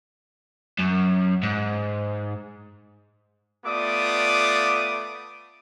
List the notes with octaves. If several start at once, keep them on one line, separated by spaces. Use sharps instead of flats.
F#2
G#2
A3 B3 F4 D5 D6 D#6